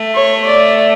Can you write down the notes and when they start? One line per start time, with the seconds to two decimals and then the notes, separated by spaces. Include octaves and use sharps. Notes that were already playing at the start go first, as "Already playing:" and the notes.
Already playing: A3
0.15 C#5
0.47 D5